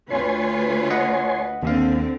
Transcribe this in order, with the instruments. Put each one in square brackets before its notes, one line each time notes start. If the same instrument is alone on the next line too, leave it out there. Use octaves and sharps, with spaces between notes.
[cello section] D2 F4 B4 [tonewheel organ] C#5 G#5 C6
[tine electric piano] D#5 F#5
[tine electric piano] D#2 F5 [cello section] D3 C4